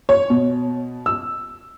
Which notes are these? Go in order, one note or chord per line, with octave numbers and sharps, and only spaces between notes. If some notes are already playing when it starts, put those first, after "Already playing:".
C#5
B2
E6